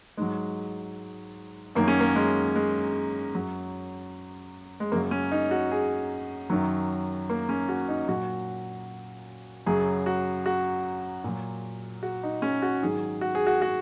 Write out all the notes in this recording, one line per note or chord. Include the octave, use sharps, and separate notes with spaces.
G#2 F#3 G#3
F#2 D#3 F#3 A#3
C#4
A#3
G#3
G#3
F#2 F#3
G#3
F#2 C#3 F#3 A#3
C#4
D#4
F#4
G#4
F#2 D#3 F#3
A#3
C#4
F#4
D#4
A#2 F#3 F#4
F#2 C#3 F#3 G#4
F#4
F#4
A#2 F#3
F#4
D#4
C#4
F#4
G#2 D#3 F#3 G#4
F#4
G#4
F#4
F#4